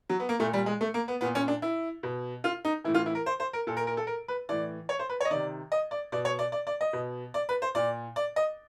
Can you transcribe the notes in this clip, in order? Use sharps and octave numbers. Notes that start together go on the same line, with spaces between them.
F#3
B3
A#3
A#2 A3
G3
G#3
A3
A#3
B3
A#2 B3
C#4
D4
E4
B2
F4
D#4
A2 E3 E4
F4
E4
A#4
C5
C5
A#4
A#2 A4
A#4
A#4
A4
A#4
B4
A2 E3 D5
C#5
C5
B4
C#5
D#5
C3 D#3 D5
D#5
D5
B2 D5
C#5
D5
D5
D5
D#5
B2
D5
B4
C5
A#2 D5
D5
D#5